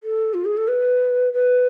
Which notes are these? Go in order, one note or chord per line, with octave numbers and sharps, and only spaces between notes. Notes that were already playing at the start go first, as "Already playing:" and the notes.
A4
F4
G#4
A4
B4
B4